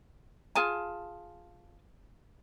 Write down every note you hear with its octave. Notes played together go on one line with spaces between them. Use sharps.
F4 G#4 G#5 A5